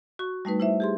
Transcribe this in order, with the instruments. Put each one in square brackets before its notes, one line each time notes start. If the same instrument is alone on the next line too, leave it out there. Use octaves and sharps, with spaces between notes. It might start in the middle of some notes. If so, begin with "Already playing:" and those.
[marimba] F#4 C#6
G3 A3 D#4 B4
E4 C5 E5
G4 G#4 C6